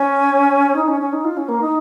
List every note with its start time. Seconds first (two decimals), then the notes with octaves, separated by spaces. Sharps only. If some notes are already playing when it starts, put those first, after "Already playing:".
Already playing: C#4
0.76 D#4
0.88 C#4
1.00 C#4
1.13 D#4
1.24 F4
1.37 C#4
1.48 A#3
1.61 D#4